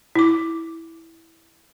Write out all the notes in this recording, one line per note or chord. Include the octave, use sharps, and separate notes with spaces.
E4 D6